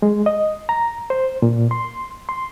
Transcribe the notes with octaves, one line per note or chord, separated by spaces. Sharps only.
G#3
D#5
A#5
C5
A#2
C6
C6